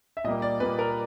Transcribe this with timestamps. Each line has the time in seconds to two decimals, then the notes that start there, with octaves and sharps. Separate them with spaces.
0.17 E5
0.24 A#2 G3 A#3 D#5
0.42 D5
0.60 A#2 G3 A#3 B4
0.79 A#4